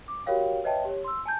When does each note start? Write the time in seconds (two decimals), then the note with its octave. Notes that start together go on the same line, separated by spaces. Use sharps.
0.08 D6
0.26 F#4 G4 A#4 C#5 F5 G5
0.64 B4 C#5 D#5 E5 G5 A5
0.85 G4 C#5
1.04 C6 E6
1.26 G#5 A5 G6